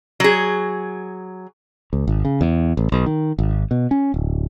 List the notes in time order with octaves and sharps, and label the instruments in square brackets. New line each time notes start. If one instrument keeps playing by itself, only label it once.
[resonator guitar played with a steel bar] F#3 G#4
[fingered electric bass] C#2
G#1
C#3
E2
A1
B1
D#3
G#1
B2
C#4
D1